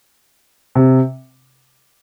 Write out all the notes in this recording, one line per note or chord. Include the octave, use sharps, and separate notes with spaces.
C3